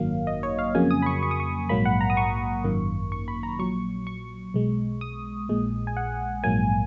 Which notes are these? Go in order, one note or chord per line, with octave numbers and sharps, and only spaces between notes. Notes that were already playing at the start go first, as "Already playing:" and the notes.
Already playing: G#1 F#2 D#3 F#3 A#3 F5
D#5
C#5
F5
F2 C#3 F#3 A#3 G#5
D#6
B5
C#6
C#6
D#6
C#6
A#1 G#2 F#3 A#3 B5
F#5
A#5
D#6
C#6
G#1 F#2 D#3 A#3
C#6
B5
A#5
A#1 A#2 F#3 C#6
C#6
B1 B2 G#3
D#6
A#1 A#2 G#3
G#5
F#5
A#1 G#2 F#3 A#3 G#5